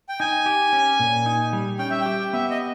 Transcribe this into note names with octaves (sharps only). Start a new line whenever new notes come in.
G5
D#4 G#5
G4
C#4
A#2
D#4
G3
C#4 G5
E5
G4 G5
B3 E5
D#5